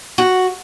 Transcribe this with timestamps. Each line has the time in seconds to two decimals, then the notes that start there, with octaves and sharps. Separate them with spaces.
0.18 F#4